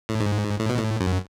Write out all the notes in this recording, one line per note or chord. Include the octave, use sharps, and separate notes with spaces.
A2
G#2
A2
B2
A2
F#2